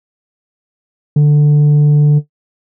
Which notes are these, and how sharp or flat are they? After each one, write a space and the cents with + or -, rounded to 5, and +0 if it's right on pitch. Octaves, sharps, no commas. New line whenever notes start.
D3 +10